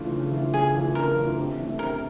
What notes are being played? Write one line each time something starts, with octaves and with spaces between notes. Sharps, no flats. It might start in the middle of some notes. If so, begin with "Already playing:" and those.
Already playing: C#3 E3 A3 D4 F4
C#3
E3 A3 D4 F4
C#3 G#4
E3 A3 D4 F4
C#3 A#4
E3 A3 D4 F4
C3
E3 A3 D4
C3 A#4